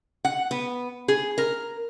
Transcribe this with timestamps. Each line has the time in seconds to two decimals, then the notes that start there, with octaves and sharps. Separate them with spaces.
0.25 F#5
0.51 B3
1.08 G#4
1.38 A#4